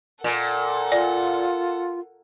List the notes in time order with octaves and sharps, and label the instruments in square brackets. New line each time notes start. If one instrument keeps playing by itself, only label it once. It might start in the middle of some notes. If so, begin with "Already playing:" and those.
[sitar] A#2 [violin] A4 F#5
[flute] F4 [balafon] D5